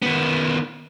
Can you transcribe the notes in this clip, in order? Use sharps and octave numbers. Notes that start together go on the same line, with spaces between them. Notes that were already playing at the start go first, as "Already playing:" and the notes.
D#3 B3